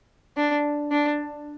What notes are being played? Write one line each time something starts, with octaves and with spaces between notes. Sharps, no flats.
D4
D4